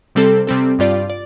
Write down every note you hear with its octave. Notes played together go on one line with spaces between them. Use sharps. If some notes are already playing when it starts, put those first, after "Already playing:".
C3 G3 C4 A4
C3 G3 C4 A4
G2 G3 F4 D5
D5